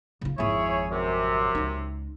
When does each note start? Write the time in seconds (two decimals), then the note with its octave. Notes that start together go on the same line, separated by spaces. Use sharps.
0.21 C#3 F4
0.38 G#1 F2 E4 G#4 C#5
0.90 F#2 C3
1.55 C#2 D#4